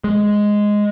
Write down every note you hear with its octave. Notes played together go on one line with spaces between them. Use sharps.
G#3